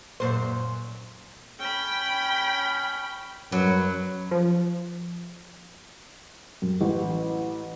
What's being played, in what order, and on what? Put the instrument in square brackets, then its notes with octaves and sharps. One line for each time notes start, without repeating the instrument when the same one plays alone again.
[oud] F#2 A#2 C5
[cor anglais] C#4 [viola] G5 B5
[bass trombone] F#2 [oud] F#3 [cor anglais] B4
[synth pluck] F3
[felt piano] F#2
A1